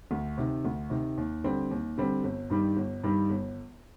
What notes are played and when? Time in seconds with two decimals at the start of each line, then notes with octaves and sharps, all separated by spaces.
0.11 D2
0.38 C3 D#3
0.65 D2
0.90 C3 D#3
1.18 D#2
1.44 D3 G3 C4
1.71 D#2
1.98 D3 G3 C4
2.24 G1
2.50 G2 D#3 G3
2.77 G1
3.03 G2 D#3 G3
3.30 G1